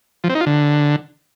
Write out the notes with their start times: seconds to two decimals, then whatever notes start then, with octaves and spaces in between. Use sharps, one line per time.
0.24 F3
0.29 C4
0.35 D#4
0.41 F4
0.46 D3